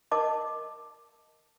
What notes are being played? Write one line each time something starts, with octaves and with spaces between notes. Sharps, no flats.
A#4 D#5 A5 D6